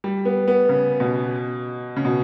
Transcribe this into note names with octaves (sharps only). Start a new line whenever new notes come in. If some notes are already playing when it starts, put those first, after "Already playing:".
G3
B3
B3
C#3
B2
C#3
B2